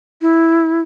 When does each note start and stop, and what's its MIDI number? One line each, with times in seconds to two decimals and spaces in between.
0.22 0.81 64